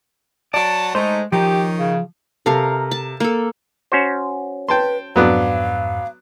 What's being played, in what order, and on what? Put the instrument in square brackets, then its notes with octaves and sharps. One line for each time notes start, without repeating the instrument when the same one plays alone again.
[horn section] F#3 F#5 A5 [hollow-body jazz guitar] D5
[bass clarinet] G#3 [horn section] A3 D#4 [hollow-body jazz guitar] C5
[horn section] D#3 C#4 D#4 [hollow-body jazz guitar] F3 [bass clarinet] G4
[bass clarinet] C#3
[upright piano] C3 A4 [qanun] A#4 F5 A#5
[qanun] A5
A#3 A4
[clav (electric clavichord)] C#4 F#4 C5
[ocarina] B4 [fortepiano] G5 A5 C6
[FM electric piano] F2 G#2 [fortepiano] F#3 B3 D4 [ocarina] F5